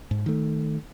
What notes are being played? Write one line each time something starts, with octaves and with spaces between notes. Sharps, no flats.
G#2
D#3 A3